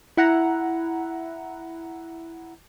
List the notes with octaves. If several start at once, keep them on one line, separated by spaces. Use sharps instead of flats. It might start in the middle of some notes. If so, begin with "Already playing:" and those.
E4 F#5 A#5